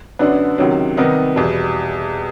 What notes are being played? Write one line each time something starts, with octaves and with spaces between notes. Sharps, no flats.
F#2 D3 F#3 B3 D4
C#2 C3 D#3 F#3
C3 D#3 G3 B3 D#4
E2 B2 G3